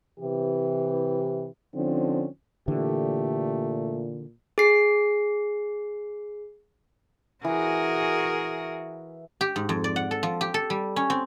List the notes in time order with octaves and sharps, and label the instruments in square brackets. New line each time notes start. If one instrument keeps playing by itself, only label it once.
[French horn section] C3 E3 G4
D3 F3 C4 C#4 D#4
[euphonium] A#2 [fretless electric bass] D3 E3 [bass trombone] A3 [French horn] G4
[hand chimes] G#4 C7
[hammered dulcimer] E3 [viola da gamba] F#4 G#4 A#4
[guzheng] G4
G#2
F2
D5
F#5
A4
F3
G4
A4
G3
C#4
C4